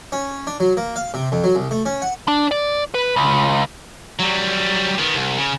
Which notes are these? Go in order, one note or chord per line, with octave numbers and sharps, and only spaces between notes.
C#4
D4
F#3
A#3
F5
C3
F2
F#3
C2
A3
C#4
F#5
D4
D5
B4
C#2
F#3 G3
D#3 B3
C2
C#3